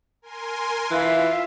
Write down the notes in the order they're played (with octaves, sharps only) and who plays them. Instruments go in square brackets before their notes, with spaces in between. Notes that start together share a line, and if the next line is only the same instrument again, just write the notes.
[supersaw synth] A#4 G#5 C6
[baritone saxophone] E3 [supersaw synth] F4 [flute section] E5 F5